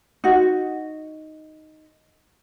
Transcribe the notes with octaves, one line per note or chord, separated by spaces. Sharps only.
D#4 F#4